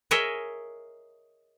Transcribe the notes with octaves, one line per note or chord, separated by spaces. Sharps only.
G#4 A#4 C#5 D#5 E5